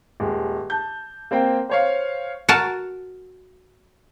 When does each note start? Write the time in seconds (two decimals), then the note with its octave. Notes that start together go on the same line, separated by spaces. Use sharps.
0.20 D#1 G#3
0.70 A5 G6
1.31 A#3 C4 C5 G5
1.69 C5 C#5 F5
2.49 F#4 A#4 A5